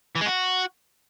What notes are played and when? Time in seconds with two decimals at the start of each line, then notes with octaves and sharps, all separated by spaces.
0.15 E3
0.21 G#3
0.26 F#4